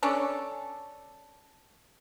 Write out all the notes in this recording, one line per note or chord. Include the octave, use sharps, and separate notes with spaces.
C#4 D4 A4